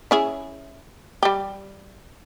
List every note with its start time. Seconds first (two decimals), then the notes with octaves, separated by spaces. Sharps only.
0.11 C#4 E4 G#4
1.23 G3 G4